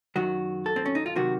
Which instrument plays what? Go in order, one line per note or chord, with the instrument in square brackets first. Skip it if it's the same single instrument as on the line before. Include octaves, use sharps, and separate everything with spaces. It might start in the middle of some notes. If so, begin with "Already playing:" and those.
[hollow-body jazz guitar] F#2 D#3 F#3 F#4
A4
C4
C#4
D#4
F4
C3 D#3 F#3 F#4